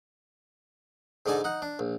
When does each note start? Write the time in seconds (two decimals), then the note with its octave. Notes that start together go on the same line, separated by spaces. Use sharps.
1.26 G#2 D3 D#4 D5 G#5 A5
1.44 D#4 F#5
1.62 D4
1.79 A#1